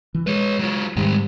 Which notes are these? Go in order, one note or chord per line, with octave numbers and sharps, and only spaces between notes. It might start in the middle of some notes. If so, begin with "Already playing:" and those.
E3
G#3 B4 C#5
F#3 F4
G#2 D#3 G3 G#3